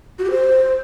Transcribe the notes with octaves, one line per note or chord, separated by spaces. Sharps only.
F#4
G4
C5